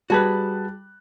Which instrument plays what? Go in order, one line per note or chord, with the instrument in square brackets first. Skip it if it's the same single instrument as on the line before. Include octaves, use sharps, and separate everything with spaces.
[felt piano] G3 A5 F#6 [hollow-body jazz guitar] F#4 G#4 B4